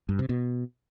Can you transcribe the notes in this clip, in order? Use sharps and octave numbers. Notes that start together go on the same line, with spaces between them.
G2
C3
B2